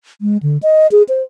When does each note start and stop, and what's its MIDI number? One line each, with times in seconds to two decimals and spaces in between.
0.21 0.37 56
0.42 0.58 50
0.62 0.87 75
0.91 1.02 68
1.09 1.22 72